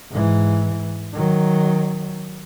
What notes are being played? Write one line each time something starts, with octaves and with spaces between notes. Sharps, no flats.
G#2 E3
D#3 F#3